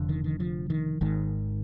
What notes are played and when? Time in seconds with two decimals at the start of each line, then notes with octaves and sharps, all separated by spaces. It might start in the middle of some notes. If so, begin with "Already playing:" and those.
Already playing: F1 F2 D3
0.09 D#3
0.24 D#3
0.40 F3
0.70 D#3
1.01 G#1 G#2 D#3